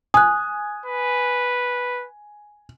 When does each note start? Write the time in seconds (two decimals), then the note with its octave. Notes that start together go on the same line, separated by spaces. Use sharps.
0.14 G#5 D#6 F#6
0.86 B4